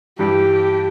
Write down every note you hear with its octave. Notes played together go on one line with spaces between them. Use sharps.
G2 E3 G3 G4